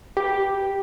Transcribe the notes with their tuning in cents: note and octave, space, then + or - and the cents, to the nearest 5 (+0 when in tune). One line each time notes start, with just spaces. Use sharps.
G4 +0 B4 -20